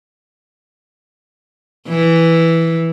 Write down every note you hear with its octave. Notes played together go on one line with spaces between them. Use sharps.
E3